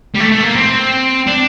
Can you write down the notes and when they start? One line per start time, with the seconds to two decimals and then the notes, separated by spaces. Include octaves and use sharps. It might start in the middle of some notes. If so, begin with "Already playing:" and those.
0.15 G3
0.20 A3
0.32 A3
0.44 A#3
0.56 C4
1.27 D4